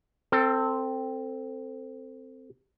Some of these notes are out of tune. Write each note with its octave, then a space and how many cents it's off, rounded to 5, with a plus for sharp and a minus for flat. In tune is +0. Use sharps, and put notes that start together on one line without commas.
C4 +0 A4 +30